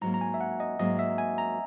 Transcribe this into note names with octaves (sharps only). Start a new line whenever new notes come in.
G#2 F#3 A#3 A#5
A#5
G#5
E5
F#5
D#5
G#2 F#3 A#3 D#5
E5
G#5
A#5